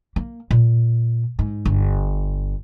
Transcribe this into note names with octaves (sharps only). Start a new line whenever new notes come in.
A#3
A#2
G#2
G1